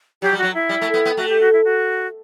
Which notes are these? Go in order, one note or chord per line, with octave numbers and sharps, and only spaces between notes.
F#3 G4
G3
F#3 F#4
E4
G3
A3
B3
B3
A3 F#4
G4
F#4
E4
F#4